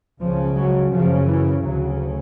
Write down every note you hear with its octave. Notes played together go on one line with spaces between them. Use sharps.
C#2 C#3 F3
F#3
F#2 C#3 F3
E3
D2 C#3 F#3